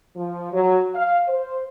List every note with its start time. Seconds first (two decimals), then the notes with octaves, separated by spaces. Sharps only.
0.16 F3
0.53 F#3
0.95 F5
1.28 C5